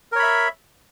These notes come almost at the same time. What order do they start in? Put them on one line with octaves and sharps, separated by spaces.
A#4 C#5 B5 E5